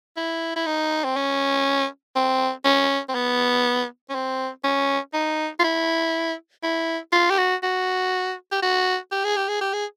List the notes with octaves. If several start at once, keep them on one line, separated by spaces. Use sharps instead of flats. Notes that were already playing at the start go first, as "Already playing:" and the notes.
E4
E4
D#4
C4
C#4
C4
C#4
C4
B3
C#4
C4
C#4
D#4
F4
E4
E4
F4
G4
F#4
F#4
G4
F#4
G4
G#4
G4
G#4
G4
G#4